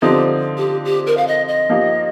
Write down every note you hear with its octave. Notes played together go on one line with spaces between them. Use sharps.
D3 F3 C4 D#4 G4
G4
G4
A#4
F5
D#5
D#5
F3 A#3 D#4 G4